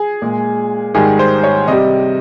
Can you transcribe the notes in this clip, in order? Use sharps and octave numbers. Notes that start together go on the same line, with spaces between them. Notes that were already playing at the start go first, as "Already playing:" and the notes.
Already playing: G#4
A#2 G#3
G#2 D#3 G3 G#4
C5
C#5
C3 G3 D#5